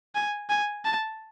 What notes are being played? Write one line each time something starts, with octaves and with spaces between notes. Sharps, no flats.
G#5
G#5
A5